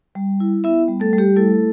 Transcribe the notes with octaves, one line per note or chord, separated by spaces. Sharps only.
G3
E4
B3 E4 E5
G3
A3 A4
G3
G4
A3 E4 A4